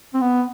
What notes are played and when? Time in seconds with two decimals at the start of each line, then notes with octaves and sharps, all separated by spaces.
0.14 C4
0.21 B3